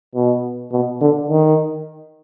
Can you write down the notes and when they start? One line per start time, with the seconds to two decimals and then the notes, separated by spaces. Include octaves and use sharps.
0.15 B2
0.72 B2
1.01 D3
1.29 D#3